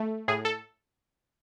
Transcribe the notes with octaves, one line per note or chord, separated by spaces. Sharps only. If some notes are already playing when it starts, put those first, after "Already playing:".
Already playing: A3
A2 G#4
A4